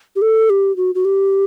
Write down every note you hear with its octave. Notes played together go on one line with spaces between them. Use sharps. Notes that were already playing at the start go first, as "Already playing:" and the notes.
G4
A4
G4
F#4
F#4
G4